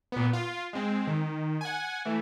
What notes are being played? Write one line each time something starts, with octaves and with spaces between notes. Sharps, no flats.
A#2 B3
F4
G#3 C4
D#3
F#5 G#5
E3 A3